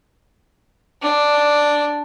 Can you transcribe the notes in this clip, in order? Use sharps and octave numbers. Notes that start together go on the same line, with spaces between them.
D4